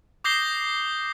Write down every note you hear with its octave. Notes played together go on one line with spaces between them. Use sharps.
D6 D#6 G6 A#6 C7 G7